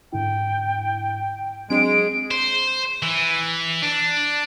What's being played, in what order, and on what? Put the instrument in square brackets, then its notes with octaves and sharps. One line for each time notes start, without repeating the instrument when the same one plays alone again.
[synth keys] G#2 D3 E4 [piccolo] G5
[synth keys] F#3 C4 D4 [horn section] G#3 [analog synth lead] D7
[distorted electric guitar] C5
E3
D4